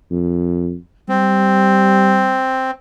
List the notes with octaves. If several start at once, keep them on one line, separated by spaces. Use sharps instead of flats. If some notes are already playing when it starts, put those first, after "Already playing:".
F2
G3 C4